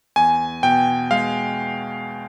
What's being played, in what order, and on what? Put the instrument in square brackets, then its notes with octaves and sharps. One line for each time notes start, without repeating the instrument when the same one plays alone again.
[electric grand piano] E2 G#5
B2 G5
G#3 F5